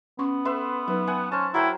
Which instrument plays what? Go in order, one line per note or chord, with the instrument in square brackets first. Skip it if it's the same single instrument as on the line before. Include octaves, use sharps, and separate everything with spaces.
[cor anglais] B3 [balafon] C#4 C6 C#6
[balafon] A4 [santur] B4 E5 C6
[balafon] F#3 D#4 B4 [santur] E5
[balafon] B4 [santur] E5 F#5 G#5
[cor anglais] C#4 [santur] C5 A5
[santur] F#3 A#4 G5 [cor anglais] E4